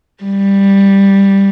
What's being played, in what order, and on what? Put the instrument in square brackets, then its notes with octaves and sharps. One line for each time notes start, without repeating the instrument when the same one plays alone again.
[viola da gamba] G3